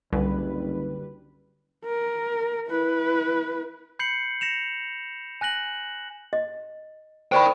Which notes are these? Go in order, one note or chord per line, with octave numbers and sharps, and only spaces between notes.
F#1 C2 D3 G3 B4
A#4
E4 B4
B5 G6 C7 C#7 F#7
A#6 C#7 E7 F7
G#5 F#6 A#6 F#7
D#5
A#4 C5 D5 G5 B5